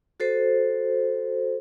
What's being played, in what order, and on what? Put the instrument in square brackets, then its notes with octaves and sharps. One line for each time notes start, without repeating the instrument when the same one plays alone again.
[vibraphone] F#4 A4 C5